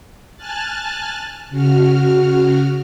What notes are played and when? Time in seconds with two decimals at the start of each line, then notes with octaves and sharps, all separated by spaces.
0.37 G#5 A5 F6 F#6 A6
1.50 C#3 F#4 F6